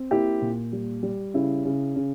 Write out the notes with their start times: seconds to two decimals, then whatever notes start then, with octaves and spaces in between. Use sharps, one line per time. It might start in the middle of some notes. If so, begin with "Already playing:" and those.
Already playing: C4
0.11 A#3 E4 G4
0.42 A#2
0.72 G3
1.03 G3
1.34 C#3 E4
1.65 C#3
1.96 C#3